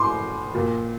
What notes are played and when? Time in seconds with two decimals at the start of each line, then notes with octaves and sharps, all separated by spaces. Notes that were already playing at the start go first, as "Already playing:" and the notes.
Already playing: A2 C6 D6
0.54 A#2